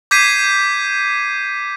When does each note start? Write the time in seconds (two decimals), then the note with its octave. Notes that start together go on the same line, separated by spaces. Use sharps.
0.11 D6 G6 G#6 B6 C7 D#7